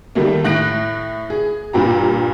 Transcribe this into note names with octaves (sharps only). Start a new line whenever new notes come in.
D#3 G3 A3 A#3
A2 F#6 A#6 D7
G#4
G2 A#2 G4 A#5